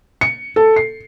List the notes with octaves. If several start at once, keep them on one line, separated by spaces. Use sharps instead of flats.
C#7
A4
C7